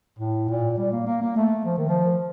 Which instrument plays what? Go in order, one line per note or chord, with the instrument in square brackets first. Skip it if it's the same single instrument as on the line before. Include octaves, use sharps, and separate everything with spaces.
[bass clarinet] A2
A#2
G3
A#3
A#3
A#3
A3
F3
D#3
F3